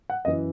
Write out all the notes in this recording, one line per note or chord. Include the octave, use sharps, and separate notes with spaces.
F#5
F#2 E3 D#5